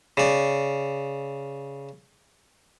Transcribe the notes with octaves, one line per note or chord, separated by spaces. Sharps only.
C#3 D5